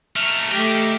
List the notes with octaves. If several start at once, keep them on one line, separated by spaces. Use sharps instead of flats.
F#3 A3 F6
A3 G4 D#5 G5